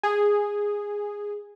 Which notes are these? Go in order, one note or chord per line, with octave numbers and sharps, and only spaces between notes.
G#4